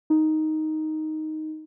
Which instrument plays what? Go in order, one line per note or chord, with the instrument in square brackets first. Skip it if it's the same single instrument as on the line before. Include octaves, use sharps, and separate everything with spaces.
[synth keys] D#4